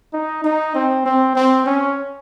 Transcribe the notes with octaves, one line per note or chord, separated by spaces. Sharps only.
D#4
D#4
C4
C4
C4
C#4